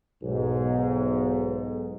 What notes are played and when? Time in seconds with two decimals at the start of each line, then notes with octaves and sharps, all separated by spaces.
0.23 B1 G#2